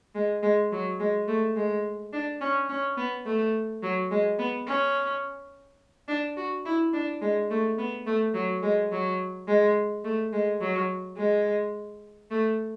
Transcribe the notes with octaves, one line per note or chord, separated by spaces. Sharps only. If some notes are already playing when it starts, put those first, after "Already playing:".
G#3
G#3
F#3
G#3
A3
G#3
D4
C#4
C#4
B3
A3
F#3
G#3
B3
C#4
D4
F#4
E4
D4
G#3
A3
B3
A3
F#3
G#3
F#3
G#3
A3
G#3
F#3
G#3
A3